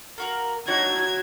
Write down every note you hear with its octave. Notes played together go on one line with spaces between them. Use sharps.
A#3 F#4 A#4
F#3 D4 D#4 F#4 C#5 G#6